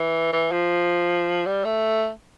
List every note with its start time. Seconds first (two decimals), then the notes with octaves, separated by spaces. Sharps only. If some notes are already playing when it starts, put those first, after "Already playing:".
Already playing: E3
0.33 E3
0.52 F3
1.46 G3
1.65 A3